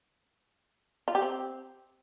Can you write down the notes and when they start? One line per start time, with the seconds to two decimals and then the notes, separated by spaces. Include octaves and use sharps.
1.08 F4
1.15 G4
1.22 C4